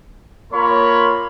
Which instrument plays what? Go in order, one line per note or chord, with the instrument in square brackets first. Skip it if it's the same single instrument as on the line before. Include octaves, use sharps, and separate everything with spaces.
[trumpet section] A#3 F4 A#4 C#5 B5 C6